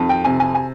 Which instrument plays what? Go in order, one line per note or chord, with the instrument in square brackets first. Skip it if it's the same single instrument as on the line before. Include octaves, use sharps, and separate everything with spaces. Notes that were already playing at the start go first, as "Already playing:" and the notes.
Already playing: [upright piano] F2 D#3
G5
C3 G#5
G#5
G#5